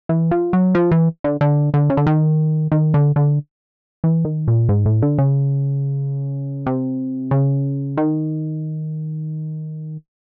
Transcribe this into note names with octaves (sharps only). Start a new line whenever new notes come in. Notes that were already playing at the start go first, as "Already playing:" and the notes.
E3
F3
F#3
F3
E3
D3
D3
D3
C#3
D3
D#3
D#3
D3
D3
E3
D#3
A#2
G#2
A2
D3
C#3
C3
C#3
D#3